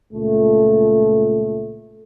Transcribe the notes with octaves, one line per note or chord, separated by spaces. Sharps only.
C#2 A#2 A3